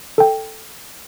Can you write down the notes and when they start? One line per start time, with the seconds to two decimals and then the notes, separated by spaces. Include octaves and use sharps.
0.18 A4 G5